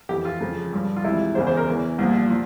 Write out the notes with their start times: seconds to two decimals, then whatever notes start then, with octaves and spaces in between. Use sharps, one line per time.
0.09 F2 E3 G4
0.25 F4
0.41 F2 C#3 F3
0.73 G2 F3
0.97 F4
1.04 C#2 C3 E3 E4
1.35 E2 C#3 E3 C5
1.47 C5
1.57 A#4
1.67 E2 E3
1.98 C2 A#2 F3
2.30 F3